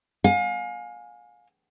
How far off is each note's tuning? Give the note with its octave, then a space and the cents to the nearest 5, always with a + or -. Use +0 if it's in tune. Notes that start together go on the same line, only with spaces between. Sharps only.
F5 +35 G#5 +0